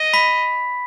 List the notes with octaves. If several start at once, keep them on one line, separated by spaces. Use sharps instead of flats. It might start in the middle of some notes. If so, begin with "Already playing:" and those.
Already playing: D#5
B5 B6